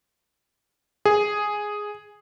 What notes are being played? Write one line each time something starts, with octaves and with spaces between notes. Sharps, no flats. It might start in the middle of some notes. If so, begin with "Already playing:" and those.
G#4